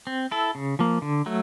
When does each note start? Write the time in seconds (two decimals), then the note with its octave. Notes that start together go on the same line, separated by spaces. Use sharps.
0.07 C4
0.31 E4 A4
0.55 C#3
0.79 F3 A#3
1.02 D3
1.26 F#3 A3